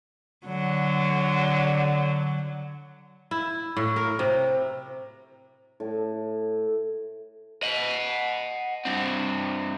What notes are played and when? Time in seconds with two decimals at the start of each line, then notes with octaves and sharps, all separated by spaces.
0.47 D3 F#3
3.31 E4
3.77 A2
3.96 A#4
4.19 C3
5.80 A2
7.63 D#5 F#5
8.85 G2 C4